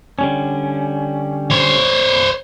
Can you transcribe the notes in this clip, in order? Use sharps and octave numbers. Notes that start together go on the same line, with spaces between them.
D3 G3 C#4
C5 C#5